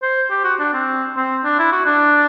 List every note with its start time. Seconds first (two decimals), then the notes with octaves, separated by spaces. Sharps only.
0.03 C5
0.30 G4
0.44 F#4
0.59 D4
0.73 C4
1.16 C4
1.44 D4
1.59 E4
1.72 F#4
1.86 D4